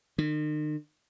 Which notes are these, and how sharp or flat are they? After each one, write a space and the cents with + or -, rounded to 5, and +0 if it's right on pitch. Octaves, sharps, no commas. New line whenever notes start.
D#3 -45